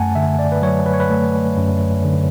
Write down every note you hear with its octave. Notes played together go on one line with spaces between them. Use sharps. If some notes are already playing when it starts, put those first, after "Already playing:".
Already playing: F#2 A3 F#5 G#5 A5
D3 E5
D5
B4
F#3 C#5
B4
C#5
B4
A3
F#2
D3